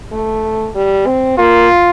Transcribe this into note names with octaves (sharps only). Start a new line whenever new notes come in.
A3
G3
C4
A#3 F4